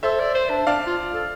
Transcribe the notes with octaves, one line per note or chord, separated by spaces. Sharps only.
A4 C5 E5
D5
C5
D4
D4 D5 F5
F4
A4